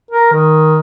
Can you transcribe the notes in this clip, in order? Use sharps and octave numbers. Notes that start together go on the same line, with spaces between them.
A#4
D#3